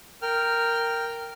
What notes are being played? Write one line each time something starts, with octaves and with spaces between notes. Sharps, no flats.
A#4 G5 F6